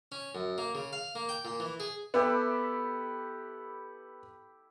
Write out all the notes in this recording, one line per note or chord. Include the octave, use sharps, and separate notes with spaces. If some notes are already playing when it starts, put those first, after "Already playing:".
C#4
F#2
A#3
C#3
F5
A#3
G5
A#2
E3
G#4
B3 E4 G4 A4